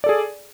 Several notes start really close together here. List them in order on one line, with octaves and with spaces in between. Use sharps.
D5 A4 G#4